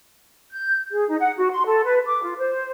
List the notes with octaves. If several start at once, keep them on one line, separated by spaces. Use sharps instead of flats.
G6
G#4
D#4
F#5
F#4
C6
A4
B4
D6
F4
C5